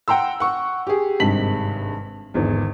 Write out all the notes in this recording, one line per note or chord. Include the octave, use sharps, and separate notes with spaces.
F#5 G5 A#5 C6 E6
F#5 C#6
G4 G#4
G#1 G2 C3 G#3 B6 F#7
G#1 E2 D3 D4